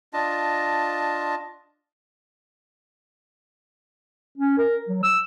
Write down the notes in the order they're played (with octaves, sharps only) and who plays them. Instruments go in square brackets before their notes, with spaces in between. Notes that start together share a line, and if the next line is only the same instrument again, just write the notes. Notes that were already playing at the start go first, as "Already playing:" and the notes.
[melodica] D4 F4 D#5 A5
[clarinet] C#4
A#4
F#3
E6